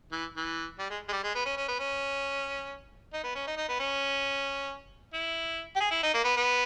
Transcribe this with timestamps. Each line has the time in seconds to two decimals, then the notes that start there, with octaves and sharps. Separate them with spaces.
0.12 E3
0.37 E3
0.79 G3
0.90 G#3
1.09 G#3
1.13 G3
1.24 G#3
1.35 B3
1.45 C#4
1.57 C#4
1.68 B3
1.79 C#4
3.13 D#4
3.24 B3
3.35 C#4
3.47 D#4
3.57 D#4
3.69 B3
3.80 C#4
5.14 E4
5.76 G4
5.80 G#4
5.91 E4
6.03 D#4
6.14 A#3
6.24 B3
6.36 B3